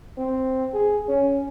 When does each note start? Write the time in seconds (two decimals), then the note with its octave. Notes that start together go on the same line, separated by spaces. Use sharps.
0.18 C4
0.73 G#4
1.08 C#4